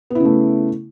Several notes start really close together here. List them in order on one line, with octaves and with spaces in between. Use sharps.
B3 E4 C#3 A3